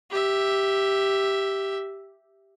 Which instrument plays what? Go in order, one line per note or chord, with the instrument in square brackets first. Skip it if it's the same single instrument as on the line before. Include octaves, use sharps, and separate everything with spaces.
[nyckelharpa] G4 E5